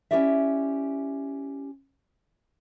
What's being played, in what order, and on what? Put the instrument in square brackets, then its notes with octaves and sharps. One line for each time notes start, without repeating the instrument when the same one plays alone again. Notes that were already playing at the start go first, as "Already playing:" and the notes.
[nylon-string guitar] C#4 D4 E4 G4 D5 E5